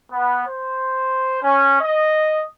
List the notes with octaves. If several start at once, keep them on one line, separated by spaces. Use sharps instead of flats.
B3
C5
C#4
D#5